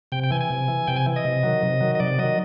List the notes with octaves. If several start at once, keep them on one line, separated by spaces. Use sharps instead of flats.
C3 G5
G5
E3 G#5
G#5
C3
E3
C3 G5
G#5
E3
D#5
C3
D#3 F#3
C3
D#3 F#3
D#5
C3 D5
D#3 F#3 D#5